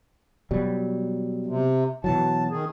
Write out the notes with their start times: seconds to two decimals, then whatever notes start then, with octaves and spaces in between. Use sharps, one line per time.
0.51 B2 F#3 G3
1.46 C3
2.04 B2 E3 F#3 A5
2.50 D#3 G#4